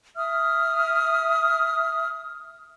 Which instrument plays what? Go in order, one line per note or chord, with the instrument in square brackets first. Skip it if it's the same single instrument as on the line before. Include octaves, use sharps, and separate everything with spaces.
[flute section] E5 D#6 F6